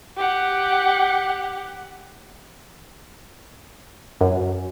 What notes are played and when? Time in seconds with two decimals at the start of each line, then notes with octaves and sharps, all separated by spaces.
0.17 G4 F#5
4.21 F#2